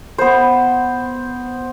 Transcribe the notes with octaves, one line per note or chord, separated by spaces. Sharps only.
B3 C5